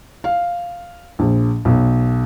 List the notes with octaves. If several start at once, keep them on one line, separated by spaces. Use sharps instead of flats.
F5
A#1
B1